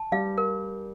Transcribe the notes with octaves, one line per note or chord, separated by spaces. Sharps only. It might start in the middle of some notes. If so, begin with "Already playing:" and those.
Already playing: A5
G3 F5
A#4